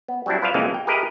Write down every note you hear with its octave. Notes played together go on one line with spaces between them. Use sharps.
B3
F#3 G3 C4 D4 E4
F4 B4 C5 D5 E5 F5
C2 F2 C#3 E3 G#3 A#3
G5
G4 G#4 A#4 B4 D#5 E5